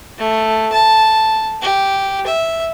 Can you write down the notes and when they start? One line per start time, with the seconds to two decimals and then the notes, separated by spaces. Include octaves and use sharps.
0.18 A3
0.72 A5
1.62 G4
2.27 E5